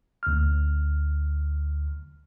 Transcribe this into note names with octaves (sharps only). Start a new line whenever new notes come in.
D2 F6